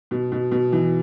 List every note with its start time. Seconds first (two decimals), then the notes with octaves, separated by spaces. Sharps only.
0.11 B2
0.32 B2
0.52 B2
0.72 E3